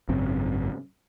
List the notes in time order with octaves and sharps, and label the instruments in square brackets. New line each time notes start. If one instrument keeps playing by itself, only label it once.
[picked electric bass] G#1 F#2 C#3 C4